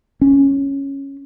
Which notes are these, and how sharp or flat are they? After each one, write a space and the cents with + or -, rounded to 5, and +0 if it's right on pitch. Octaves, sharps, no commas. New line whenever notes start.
C#4 -5